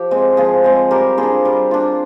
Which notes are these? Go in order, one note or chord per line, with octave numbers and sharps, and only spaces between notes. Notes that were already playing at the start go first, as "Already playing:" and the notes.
Already playing: F3 G4
G#3 C4
F3 F4 G#4
G#3 C4
G3 G4 A#4
F4 G#4 C5
D4
G3
D4 F4